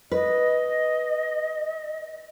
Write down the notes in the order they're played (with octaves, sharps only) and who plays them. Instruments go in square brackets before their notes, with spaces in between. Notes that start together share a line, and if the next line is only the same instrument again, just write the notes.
[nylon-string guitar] B4 [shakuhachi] D#5